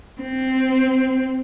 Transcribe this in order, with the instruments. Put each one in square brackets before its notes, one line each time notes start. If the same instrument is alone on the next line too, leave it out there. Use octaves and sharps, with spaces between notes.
[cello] C4